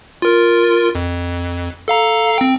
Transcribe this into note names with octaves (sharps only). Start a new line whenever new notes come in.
F4 A#4
F2
A4 F5 A#5
C4 G5